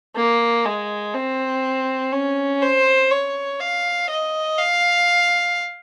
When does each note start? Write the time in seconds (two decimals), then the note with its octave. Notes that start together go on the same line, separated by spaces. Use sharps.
0.16 A#3
0.66 G#3
1.14 C4
2.13 C#4
2.62 C5
3.11 C#5
3.60 F5
4.09 D#5
4.58 F5